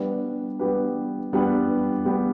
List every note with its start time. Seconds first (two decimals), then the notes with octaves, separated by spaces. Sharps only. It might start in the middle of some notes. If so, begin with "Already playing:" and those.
Already playing: G3 B3 D4 G4 B4
0.59 G3 B3 D4 G4 B4
1.33 G3 B3 D4 G4 B4
2.05 G3 B3 D4 G4 B4